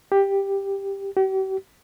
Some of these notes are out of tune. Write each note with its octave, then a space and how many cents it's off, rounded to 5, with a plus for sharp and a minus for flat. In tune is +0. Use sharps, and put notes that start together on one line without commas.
G4 +5
G4 -45